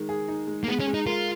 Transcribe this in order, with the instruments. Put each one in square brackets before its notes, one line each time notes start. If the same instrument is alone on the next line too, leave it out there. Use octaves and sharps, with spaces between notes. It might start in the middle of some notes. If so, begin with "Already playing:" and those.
Already playing: [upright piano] D#3 G#3 D#4
G#4
D#4
G#3
[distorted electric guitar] A#3
[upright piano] G#3 [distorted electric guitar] B3
[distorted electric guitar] C#4
[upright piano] G#3
[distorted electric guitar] D#4
[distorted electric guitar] F4 [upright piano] A#4